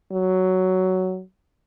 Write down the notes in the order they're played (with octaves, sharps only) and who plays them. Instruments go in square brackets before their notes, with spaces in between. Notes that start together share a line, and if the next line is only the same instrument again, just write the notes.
[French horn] F#3